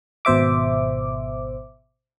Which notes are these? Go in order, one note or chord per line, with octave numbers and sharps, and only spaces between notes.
G#1 B2 C5 E5 D6